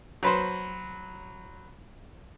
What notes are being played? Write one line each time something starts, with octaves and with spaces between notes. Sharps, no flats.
F#3 B4 C5